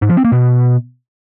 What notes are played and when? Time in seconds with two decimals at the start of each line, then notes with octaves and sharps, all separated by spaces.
0.02 G#2
0.10 F3
0.17 C4
0.25 A#3
0.32 B2